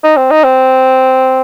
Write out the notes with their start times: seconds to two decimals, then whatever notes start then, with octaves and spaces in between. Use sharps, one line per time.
0.04 D#4
0.17 C4
0.30 D#4
0.44 C4